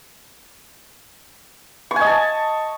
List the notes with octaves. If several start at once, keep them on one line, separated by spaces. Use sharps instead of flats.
C#6
G#5
D#5
A5